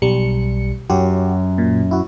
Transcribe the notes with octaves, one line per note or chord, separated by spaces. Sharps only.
B1 G3 C#7
F#2 F#4 G4
A#2
E4 F#4